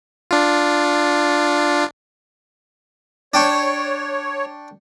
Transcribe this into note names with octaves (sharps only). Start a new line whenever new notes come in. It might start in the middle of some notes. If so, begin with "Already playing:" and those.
D4 F4
D4 C#5 G5 C#6